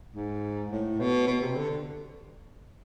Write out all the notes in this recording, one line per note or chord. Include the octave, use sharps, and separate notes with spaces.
G#2
A2
B2
B2
C3
D3